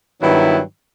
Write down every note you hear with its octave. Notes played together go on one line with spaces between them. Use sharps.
G2 D#3 F#3 B3 E4